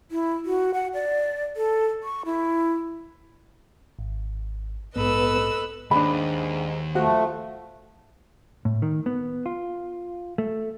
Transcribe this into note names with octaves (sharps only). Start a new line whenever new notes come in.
E4
F#4
F#5
D5
A4
C#6
E4
G#1
A#1 G#2 B3 A4 B4 D#5 B5 E6
D#2 G#2 D4 B5
F3 A3 F#4
A2
D#3
B3
F4
A3